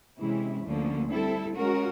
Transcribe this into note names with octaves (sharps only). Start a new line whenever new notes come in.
C3 E3 G#3 C#4 E4
D2 D3 F3 A#3 C#4
G3 C4 E4 A4
G#3 C#4 F#4 A#4